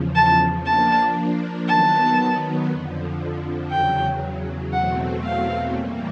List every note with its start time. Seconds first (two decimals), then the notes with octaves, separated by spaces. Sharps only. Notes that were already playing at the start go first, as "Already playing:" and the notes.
Already playing: E2 C#3 F3
0.15 A5
0.66 F3 A#3 D4 A5
1.68 D#3 F#3 B3 A5
2.69 F2 D3 F3
3.71 E2 C#3 F#3 G5
4.73 E2 B2 F#3 A3 C4 F#5
5.24 F5
5.74 A2 E3 G3 A#3